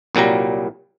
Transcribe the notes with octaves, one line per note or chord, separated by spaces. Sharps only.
C2 A#2 F#3 G3 A#5